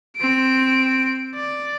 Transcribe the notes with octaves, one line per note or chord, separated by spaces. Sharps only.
C4 D7
D5